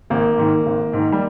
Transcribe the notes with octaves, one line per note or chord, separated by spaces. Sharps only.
G#1 A#3
G#2 D#3
G#1
G#2 D#3
G3